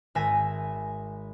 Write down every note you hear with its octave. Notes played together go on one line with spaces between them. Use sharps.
G#1 E5 G#5 A#6